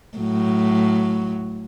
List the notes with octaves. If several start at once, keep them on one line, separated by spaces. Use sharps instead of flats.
A2 F#3